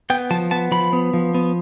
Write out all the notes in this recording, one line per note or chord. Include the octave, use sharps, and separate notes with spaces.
B3 G5
F3 A5
B3 A5
F3 B5
B3
F3
B3